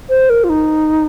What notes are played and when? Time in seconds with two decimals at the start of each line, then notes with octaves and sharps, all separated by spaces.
0.09 C5
0.30 A#4
0.44 F4
0.49 D#4